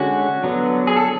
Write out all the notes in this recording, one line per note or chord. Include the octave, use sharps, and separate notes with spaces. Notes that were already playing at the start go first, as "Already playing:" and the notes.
Already playing: D3 G#3 C#4 F#4
D3 F#3 B3
G#4
A4